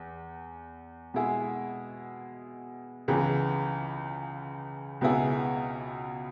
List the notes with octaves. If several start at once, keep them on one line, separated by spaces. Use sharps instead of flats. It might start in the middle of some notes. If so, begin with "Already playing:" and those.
Already playing: E2
B2 G#3 E4 G#4
C#2 C#3 E3 B3 G#4
C#2 B2 B3 E4 G#4